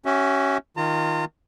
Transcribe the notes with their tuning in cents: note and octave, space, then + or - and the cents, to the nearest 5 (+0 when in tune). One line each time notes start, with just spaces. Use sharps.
C#4 +0 F#4 +45 E5 -10
D#3 +10 F4 +0 A#5 -40